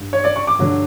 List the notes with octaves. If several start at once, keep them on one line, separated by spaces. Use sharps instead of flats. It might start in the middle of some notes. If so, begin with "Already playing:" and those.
Already playing: G2
C#5
D5
C#6
D6
G2 D3 F#3